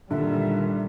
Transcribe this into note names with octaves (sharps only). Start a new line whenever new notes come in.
A#2 D3 D#3 G3 E5